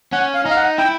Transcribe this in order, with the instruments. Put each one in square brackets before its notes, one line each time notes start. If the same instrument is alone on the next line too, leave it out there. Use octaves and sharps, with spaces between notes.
[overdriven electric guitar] C#4 [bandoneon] F#5
[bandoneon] F5
[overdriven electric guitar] D#4
[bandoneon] F5
F#5
[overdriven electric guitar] E4 [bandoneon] G5